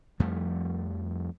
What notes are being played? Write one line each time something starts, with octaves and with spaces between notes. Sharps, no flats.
F2 F3 G3 A3